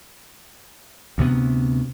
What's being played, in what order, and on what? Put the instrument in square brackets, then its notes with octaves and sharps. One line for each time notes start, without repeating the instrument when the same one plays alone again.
[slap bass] D2 C3 B3